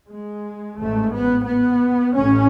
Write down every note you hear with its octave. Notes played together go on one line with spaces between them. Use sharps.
G#3
A1 G#2 A3
B3
B3
A1 A2 C#4